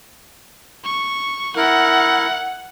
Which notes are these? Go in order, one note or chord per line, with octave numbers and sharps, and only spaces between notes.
C#6
E4 A#4 F#5